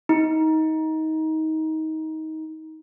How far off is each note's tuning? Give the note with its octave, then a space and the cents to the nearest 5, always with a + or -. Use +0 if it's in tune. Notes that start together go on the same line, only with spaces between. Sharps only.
D#4 +20